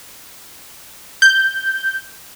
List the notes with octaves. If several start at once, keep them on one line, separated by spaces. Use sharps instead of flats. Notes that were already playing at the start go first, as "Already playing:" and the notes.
G6